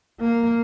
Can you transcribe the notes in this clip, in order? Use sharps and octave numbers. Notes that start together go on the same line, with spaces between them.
A#3